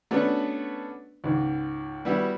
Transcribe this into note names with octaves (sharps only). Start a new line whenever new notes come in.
A3 B3 C#4 D4 F#4 B4
C#2 G#2
G3 B3 E4 F#4